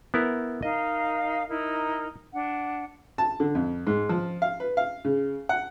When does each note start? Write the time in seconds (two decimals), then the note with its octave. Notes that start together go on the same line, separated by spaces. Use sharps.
0.14 B3 E4 A#4
0.63 D#4 A#4 D#5 F5
1.48 D#4 E4 A#4
2.34 D4 F#5
3.18 A5
3.40 D3
3.55 F2
3.87 G#2
4.09 F3
4.42 F5
4.60 B4
4.77 F5
5.05 C#3
5.49 F#5